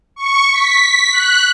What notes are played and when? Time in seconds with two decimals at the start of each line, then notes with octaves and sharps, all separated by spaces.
0.16 C#6
0.52 B6
1.12 F#6